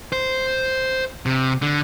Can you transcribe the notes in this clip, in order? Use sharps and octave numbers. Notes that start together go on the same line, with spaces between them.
C5
C3
D3